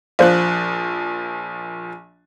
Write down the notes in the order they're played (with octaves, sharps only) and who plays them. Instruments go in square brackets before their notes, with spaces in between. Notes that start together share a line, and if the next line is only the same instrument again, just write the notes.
[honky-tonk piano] A#1 F3 F#6 [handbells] C5 D5 F5